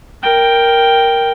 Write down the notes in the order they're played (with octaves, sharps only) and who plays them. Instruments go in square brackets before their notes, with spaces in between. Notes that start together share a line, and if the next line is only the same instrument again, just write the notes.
[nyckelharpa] A#4 G5